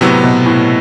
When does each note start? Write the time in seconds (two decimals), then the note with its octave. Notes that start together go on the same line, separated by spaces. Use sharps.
0.01 A2 C3 F#3 B3
0.24 B2
0.46 A2